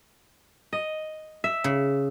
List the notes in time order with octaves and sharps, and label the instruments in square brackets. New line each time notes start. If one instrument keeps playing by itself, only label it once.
[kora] D#5
E5
[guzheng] C#3